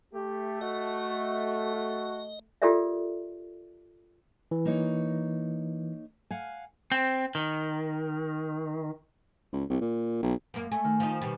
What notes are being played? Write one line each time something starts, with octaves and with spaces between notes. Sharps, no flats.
A3 G4
F#4 D#5
F#4
F4 G4 A4 A#4 D5 E5
E3
A#3 D#4 C#5
F5 F#5 G#5
C4
D#3
C#2
C2
A#2
B1
F#2 A#3
A3 G#5
D#3
F3 D#4
B2 G3